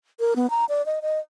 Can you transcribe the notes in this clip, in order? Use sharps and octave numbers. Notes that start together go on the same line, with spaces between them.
A#4
B3
A#5
D5
D#5
D#5